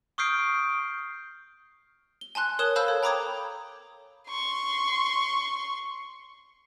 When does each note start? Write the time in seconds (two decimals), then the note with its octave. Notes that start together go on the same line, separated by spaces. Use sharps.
0.18 C#6 D#6 F6 G6 C7 D7
2.21 G7
2.35 G#5 A5 C6 F#6
2.59 A#4 C#5 D#6 F#6 E7 G7
2.76 C5 F5 A5 B5 E6 G6
2.88 A4 C#5
3.03 G5 A#5 B5 D6 D#6 G#6
4.29 C6 C#6